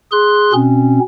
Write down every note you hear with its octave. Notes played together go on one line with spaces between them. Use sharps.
G#4 C6 F#6
B2 C4 C#4